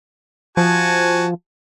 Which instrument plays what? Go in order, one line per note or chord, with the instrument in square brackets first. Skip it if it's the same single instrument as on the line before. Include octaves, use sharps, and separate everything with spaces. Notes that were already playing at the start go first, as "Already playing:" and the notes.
[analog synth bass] F3 [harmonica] F#4 G#5 A5